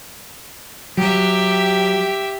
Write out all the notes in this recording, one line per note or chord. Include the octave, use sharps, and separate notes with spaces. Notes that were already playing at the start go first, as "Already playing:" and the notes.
F#3 G4 E5